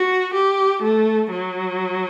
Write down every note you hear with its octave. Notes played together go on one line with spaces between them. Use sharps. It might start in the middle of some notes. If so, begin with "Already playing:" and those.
Already playing: F#4
G4
A3
F#3